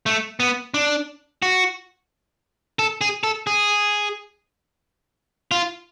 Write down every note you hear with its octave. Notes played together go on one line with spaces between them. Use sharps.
A3
B3
D4
F#4
A4
G#4
A4
G#4
F4